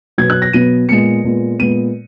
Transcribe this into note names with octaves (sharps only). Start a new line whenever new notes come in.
B2 F#3 B3 G#6
F#6
A#6
B2 F#3 B3 D#7
A#2 G#3 B3 C#7
A#2 G#3 B3
A#2 G#3 B3 D#7